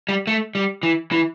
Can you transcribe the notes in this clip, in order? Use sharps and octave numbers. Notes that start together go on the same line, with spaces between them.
G3
A3
G3
E3
E3